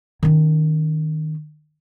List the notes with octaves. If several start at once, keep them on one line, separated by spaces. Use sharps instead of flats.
D#3 C#4